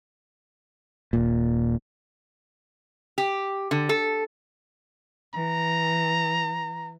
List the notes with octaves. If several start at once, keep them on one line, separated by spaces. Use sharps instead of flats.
D#1 A#2
G4
D3
A4
E3 A#5